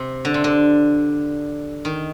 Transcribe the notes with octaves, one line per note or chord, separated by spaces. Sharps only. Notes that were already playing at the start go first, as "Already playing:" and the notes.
Already playing: C3
D3
C3
D3
D#3